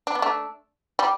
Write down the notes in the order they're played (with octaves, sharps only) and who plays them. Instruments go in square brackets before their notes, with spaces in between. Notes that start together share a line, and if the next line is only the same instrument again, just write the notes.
[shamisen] D4
B3
A3 D4
G3